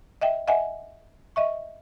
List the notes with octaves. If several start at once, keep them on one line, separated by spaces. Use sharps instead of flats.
D#5 E5 G5
D#5 E5 F#5 G#5
D#5 E5 C#6